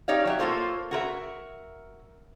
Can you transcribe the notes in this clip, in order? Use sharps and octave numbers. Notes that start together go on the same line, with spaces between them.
D#4 G4 C#5 D5 F5
F#3 G4 E5
A#3 F4 A4 C5 C#5
F#4 A#4 B4 E5